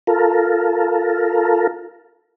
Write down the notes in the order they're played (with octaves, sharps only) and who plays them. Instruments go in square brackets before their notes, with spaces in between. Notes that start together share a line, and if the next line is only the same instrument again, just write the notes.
[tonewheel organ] F4 A4 A#4